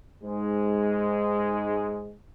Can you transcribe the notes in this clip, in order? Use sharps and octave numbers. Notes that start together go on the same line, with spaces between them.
G#2 G#3